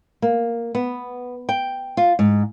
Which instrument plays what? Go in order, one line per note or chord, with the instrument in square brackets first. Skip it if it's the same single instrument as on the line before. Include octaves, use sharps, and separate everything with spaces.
[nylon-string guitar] A#3
B3
G5
F4
G#2